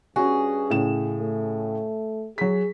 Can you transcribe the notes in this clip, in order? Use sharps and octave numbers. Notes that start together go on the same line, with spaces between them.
G2 C#4 F#4 G#4
A2 C#3 E7
A3
F#3 G#4 B6